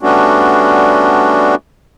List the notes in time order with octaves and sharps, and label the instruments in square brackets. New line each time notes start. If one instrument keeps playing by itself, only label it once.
[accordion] G3 A3 B3 C#4 D4 F#4